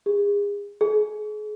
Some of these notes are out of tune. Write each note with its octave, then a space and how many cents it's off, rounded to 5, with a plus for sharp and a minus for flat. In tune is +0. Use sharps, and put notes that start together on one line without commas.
G#4 -35
G#4 +35